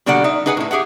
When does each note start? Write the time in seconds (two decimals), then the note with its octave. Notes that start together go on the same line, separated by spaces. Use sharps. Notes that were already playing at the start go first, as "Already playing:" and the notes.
0.06 B2 D3 G3 A#3 D5 F#5
0.24 D#4 E5
0.46 D#4 G#4 B4 F#5 G#5
0.57 A2 E4
0.71 G4 G#4 E5 F#5